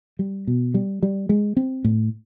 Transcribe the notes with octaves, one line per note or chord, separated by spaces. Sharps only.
G3
B2
G3
G3
G#3
C4
A2